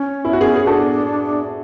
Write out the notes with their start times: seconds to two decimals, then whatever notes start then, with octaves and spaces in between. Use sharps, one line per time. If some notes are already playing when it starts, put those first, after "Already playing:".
Already playing: C#4
0.25 E4
0.33 F#4
0.40 C#4 E4 G#4
0.56 G#4
0.67 D4 F#4 A4